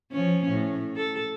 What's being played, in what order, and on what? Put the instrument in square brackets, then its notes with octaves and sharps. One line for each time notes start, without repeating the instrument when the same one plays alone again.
[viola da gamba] F3 C#4
A2
A4